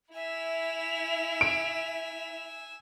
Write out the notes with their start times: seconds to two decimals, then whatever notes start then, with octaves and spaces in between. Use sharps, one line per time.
0.15 E4 E5 G#5 E6 F7
1.41 D7